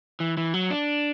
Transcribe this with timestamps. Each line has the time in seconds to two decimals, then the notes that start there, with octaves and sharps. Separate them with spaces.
0.20 E3
0.37 E3
0.54 F#3
0.70 D4